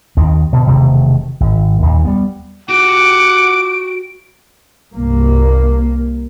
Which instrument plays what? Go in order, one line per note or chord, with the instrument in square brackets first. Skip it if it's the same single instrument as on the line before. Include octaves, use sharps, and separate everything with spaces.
[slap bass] D#2 D#3 C4
B2 D3
E1 C3 D#3 A3
G#1
D#2 A#2
G3 B3
[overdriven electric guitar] F#4 G4 [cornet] F#5 [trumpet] D6 [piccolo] D7
[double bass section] C2 G2 A#3